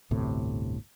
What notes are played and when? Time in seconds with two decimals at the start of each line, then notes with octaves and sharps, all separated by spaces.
0.11 G1 D2 A2 C3